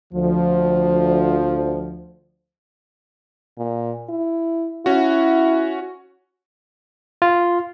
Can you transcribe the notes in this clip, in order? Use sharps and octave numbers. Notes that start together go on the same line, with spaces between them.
D2 F3
A#2
E4
C#4 E4 F#4
F4